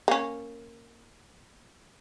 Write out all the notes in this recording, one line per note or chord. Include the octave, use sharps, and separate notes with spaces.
A#3 C#4